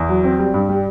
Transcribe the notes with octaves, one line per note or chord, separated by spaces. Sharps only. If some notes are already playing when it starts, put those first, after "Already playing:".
Already playing: E2
F#3
C4
G3
G2
G3